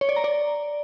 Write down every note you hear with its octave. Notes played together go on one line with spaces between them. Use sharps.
C#5
D5
A#5
D5